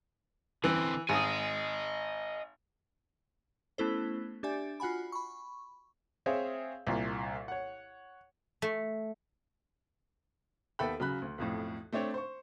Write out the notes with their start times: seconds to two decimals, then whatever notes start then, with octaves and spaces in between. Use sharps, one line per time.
0.64 D3 E3 C4
1.09 G#1 D#5 G#5 D#6
3.78 A3 B3 C#4 E4 A4 C5
4.43 D4 G4 D5 E5 G#5
4.80 F4 F#4 F#5 G#5 B5
5.12 B5 C#6
6.26 C4 G#4 C#5 E5 F5
6.87 C2 A#2
7.48 C#5 F#5
8.62 A3
10.79 D#2 B3 A4 E5 G5 B5
11.00 C#3 F#3 B5 F#6
11.22 D2
11.38 B1 F2 A2
11.93 A3 C4 D4 C#5
12.14 C5 C#6